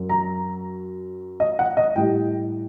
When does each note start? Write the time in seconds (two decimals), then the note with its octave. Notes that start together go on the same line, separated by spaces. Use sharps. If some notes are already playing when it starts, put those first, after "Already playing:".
Already playing: F#2 F#3
0.09 A#5
1.40 D#5
1.59 F#5
1.77 D#5
1.96 A2 G3 G5